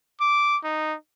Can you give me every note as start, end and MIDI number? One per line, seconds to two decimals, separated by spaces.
0.21 0.57 86
0.64 0.95 63